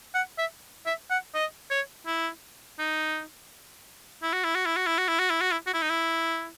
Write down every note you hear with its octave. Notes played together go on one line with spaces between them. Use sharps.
F#5
E5
E5
F#5
D#5
C#5
E4
D#4
E4
F#4
E4
F#4
E4
F#4
E4
F#4
E4
F#4
E4
F#4
E4
F#4
E4
D#4
E4